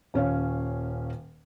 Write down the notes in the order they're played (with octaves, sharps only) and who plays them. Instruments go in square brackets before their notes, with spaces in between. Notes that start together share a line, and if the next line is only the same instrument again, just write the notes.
[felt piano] D#1 C#4 C#5 F5